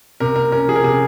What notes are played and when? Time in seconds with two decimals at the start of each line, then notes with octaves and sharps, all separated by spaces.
0.20 C3 A#4
0.36 A#3 A#4
0.52 C#4 A#4
0.68 F3 G#4
0.76 A#4
0.84 C3 G#4